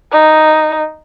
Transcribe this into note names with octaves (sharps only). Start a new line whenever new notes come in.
D#4